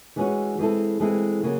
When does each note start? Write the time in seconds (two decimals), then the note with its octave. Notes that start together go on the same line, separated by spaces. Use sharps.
0.16 E3 G#3 C#4 F#4
0.58 E3 G#3 C4 E4 A4
1.00 E3 G#3 C4 E4 A4
1.43 C#3 F#3 A#3